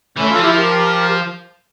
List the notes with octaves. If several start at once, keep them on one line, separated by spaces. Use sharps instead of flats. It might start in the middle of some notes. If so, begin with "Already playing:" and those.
E3 A3 C#4
F4 A4
F3
E4 G4
G4 A#4